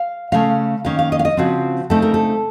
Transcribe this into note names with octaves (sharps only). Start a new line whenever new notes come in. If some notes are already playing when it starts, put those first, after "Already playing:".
Already playing: F5
C#3 A3 C#4 F5
D#3 A#3 C#4 F5
F5
D#5
F5
D#5
C#3 F3 C4 F#4
C#3 A3 C4 D#4 A4
A#4
A4